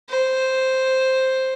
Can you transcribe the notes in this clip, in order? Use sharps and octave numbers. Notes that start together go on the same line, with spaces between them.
C5